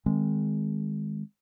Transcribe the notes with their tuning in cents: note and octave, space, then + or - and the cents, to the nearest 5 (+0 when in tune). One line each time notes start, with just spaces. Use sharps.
D#3 +0 G#3 -5 C4 -10